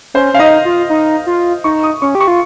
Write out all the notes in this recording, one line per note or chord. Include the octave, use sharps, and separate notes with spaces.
C#4 C5
C#4 F5
D#4 D#5
F4
D#4
F4
D#4 C#6
D#6
C#4 C#6
G4
C#6
F4